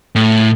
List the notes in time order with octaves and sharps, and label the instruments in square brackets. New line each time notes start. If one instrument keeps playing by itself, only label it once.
[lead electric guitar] A2